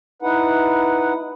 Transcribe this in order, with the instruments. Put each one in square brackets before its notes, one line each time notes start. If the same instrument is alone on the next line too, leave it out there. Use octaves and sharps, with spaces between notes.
[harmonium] D#4 E4 B4 F#5